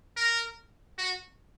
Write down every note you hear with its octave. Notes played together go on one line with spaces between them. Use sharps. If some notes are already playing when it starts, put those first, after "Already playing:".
A#4
F#4